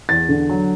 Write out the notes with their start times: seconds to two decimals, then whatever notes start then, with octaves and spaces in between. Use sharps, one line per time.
0.09 E2 A6
0.29 D3
0.49 F#3